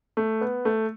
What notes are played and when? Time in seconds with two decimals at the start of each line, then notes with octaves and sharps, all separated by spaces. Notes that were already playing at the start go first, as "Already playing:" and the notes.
0.17 A3
0.41 B3
0.65 A3